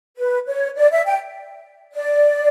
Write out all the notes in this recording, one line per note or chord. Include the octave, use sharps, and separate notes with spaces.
B4
C#5
D5
E5
G5
D5